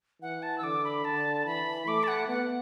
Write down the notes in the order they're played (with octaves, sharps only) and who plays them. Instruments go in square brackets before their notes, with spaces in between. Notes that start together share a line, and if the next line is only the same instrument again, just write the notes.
[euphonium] E3 [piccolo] F#5
[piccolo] A5
E6
[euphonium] D3 [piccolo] D6
[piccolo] B5
[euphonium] D3 [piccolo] A5
[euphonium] E3 [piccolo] B5
[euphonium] A3 [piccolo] D6
[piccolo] A5
F#5
[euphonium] B3 [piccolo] F#5